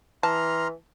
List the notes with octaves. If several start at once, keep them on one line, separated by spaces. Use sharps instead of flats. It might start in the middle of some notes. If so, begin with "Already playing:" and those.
E3 A5 A#5 C6 F6